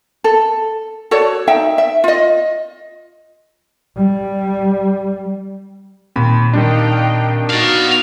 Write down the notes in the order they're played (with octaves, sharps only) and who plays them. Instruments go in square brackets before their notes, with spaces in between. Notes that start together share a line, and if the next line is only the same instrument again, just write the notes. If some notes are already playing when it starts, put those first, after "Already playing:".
[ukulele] A4
F#4 A4 C#5 D5
D#4 E5 G5
E5
F4 D#5
[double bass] G3
[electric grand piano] D#2 B5 [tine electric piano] A#2 C4
[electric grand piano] D#3 G3 D4 [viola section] D#5 F5 G5
[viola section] B3 D#4 F#4 [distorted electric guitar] D5 F5